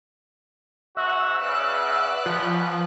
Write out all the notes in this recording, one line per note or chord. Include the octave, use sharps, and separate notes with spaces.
G#2 F#4 E5 F#5 E6
C#3 B4 D5 F#6
C#2 F3 B3